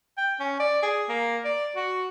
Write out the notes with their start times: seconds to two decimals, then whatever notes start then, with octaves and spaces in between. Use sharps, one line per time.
0.18 G5
0.40 C#4
0.60 D5
0.83 G#4
1.09 A#3
1.45 D5
1.76 F#4